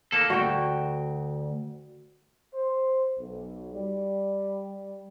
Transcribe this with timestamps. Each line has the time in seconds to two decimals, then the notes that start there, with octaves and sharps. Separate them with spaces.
0.12 A#3 A4
0.30 D2 F#4 G5
2.53 C5
3.18 B1
3.72 G3